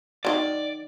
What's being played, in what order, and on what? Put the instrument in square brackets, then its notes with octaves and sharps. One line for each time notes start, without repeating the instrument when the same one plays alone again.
[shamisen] D#3 F#3 [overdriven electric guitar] D5